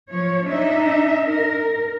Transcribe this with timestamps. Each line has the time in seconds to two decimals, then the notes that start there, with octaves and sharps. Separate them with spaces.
0.10 F3 C#5
0.48 D4 D#4 E5
1.31 A#4